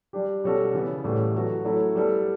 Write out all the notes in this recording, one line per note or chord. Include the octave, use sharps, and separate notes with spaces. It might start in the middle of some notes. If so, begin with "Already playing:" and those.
G3 D4 G4
B2 G3 C#4 F#4 A4
C#3 E3 B3
A2 E3 G3 C#4
F#3 B3 F#4 A4
F#3 A3 C#4 E4 A4
G3 B3 D4 A4